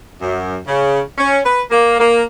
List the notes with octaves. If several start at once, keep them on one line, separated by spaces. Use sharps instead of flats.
F#2
C#3
C#4
B4
A#3
A#3